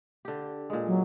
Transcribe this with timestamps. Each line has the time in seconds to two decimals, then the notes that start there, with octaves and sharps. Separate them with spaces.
0.25 D3 G4
0.70 A#2 G#3
0.87 F#3